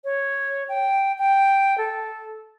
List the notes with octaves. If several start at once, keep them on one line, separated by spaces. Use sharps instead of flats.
C#5
G5
G5
A4